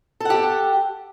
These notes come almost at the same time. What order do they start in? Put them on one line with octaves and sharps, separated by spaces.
A4 F#5 G4